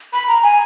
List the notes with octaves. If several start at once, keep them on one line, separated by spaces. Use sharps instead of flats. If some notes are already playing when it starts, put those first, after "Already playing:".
B5
A#5
G#5